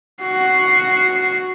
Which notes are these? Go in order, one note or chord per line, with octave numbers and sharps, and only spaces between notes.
F#4 C7